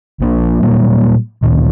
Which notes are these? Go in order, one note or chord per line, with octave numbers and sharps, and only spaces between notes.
A#1 F3 A#3 D4
A#2 F#3 G3 A#3
A1 D2 A#2 D#3